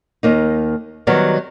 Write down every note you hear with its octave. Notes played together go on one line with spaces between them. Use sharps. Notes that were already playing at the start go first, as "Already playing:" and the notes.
D#2 A#3 D#4
D#3 F#3 G3 B3